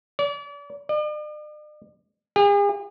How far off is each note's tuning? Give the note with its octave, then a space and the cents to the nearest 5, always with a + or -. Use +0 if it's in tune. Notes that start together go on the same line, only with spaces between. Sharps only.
D5 -40
D5 +45
G#4 -45